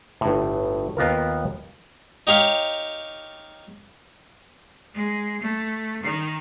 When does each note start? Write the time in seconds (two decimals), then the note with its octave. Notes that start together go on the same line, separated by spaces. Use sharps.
0.21 G1 A2
0.97 D#2 B3 F4 A#4
2.27 D#4 G4 C#5 F5
4.94 G#3
5.41 A3
6.03 D#3